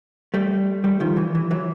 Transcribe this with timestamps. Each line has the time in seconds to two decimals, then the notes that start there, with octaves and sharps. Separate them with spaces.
0.34 G3 A3
0.84 G3 A3
1.00 D#3 F3
1.17 E3
1.35 E3
1.51 E3 F#3